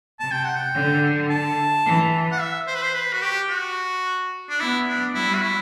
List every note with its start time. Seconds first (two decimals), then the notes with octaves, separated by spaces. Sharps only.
0.20 C3 A5
0.32 G5
0.45 F#5
0.56 G5
0.74 D3
1.30 A5
1.85 E3
2.31 F#5
2.40 E5
2.67 C5
2.75 B4
2.83 C5
2.94 B4
3.13 F#4
3.22 G4
3.49 F#4
4.50 D4
4.60 B3 E4
4.87 D4
5.15 G3 E4
5.35 F#4
5.42 E4